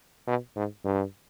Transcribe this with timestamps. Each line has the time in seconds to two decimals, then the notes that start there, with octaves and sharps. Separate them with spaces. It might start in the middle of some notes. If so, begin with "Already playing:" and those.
0.27 B2
0.56 G#2
0.85 G2